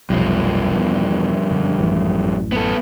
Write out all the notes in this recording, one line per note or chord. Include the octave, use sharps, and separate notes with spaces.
F1 B1 G2 F3
E2 B2
F#2 D3 G3
A1 F#2 E3
B3 A4